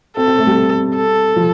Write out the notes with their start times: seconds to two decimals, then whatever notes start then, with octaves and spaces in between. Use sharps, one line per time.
0.17 C4 A4
0.27 C4
0.38 A3
0.47 G3
0.96 A4
1.36 F3